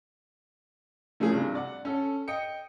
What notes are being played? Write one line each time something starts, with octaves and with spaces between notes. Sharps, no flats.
F3 A3 A#3 C#4 E4 G#4
G2 C3
D5 F#5
C#4 A4
D#5 G5 D#6 C#7